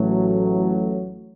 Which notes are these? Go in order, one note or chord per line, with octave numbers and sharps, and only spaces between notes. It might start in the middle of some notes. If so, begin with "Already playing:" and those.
Already playing: A1 A2 F#3 A3